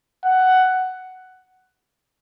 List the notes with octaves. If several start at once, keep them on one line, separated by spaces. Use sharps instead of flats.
F#5